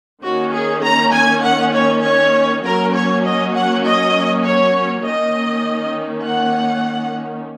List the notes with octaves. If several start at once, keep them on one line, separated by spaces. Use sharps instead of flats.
D#3 A#3 C#4 F#4
G#4
A#5
G#5
F#5
C#5
C#5
F#3 A#3 C#4 A#4
C#5
D#5
F#5
D#5
C#5
D#3 A#3 C#4 D#5
F#5